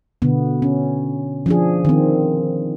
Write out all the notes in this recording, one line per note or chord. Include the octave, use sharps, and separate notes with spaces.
B2 D3 B3
C#4
F3 D4 G#4
D#3 C4